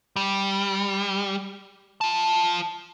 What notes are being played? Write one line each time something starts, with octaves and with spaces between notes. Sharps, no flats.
G3
F4 A5